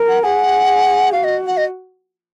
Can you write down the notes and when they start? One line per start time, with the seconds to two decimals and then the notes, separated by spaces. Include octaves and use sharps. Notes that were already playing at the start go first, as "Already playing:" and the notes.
Already playing: A#4
0.09 F#5
0.23 G#4 F#5
1.12 F#4 F5
1.24 D#5
1.46 F#5
1.57 D#5